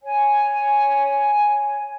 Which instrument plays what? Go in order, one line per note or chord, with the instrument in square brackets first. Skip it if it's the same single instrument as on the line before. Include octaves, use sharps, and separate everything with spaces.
[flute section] C#5 G#5